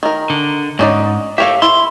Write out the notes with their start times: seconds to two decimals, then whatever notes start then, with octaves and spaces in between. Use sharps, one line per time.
0.03 D#3 A#4
0.30 D3
0.79 G#2 C#4 D#4 D5
1.38 G4 A4 A#4 C#5 E5 F5
1.62 E4 C6